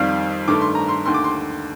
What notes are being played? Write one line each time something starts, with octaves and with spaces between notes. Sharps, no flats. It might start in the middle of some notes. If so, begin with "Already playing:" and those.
Already playing: F2 D#3 G3 F5
G2 D#3 A3 D6
C6
A#5
C6
D#2 D3 A3 C6
D6
C6